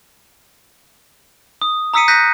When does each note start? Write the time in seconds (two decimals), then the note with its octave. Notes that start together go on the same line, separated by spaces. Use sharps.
1.62 D#6
1.94 A#5 D#6 E6 B6 C#7 D#7
2.08 F#6 G6 A#6 B6 D#7